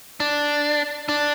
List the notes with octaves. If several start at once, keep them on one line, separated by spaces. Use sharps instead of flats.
D4
D4